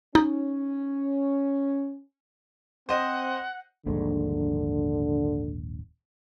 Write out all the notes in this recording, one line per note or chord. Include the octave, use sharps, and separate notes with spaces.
C#4 D#4
C4 C5 D#5 F#5
D#1 A#1 G#2 D3